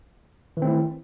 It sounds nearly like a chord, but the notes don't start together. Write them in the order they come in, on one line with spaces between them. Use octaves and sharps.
E3 D#3 C4 A3 E4